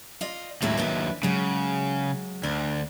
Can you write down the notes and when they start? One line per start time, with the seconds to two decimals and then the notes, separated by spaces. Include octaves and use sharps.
0.21 F4 D5 D#5
0.62 D#2 A2 F#3 G#3 E4
0.77 D4 E4 B4
1.23 C#3 F#3 G#3
2.44 D2 D4